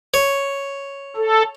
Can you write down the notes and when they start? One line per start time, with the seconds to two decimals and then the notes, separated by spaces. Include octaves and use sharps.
0.14 C#5
1.16 A4